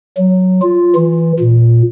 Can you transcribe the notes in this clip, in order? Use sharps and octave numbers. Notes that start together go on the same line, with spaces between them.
F#3
F4
E3
A#2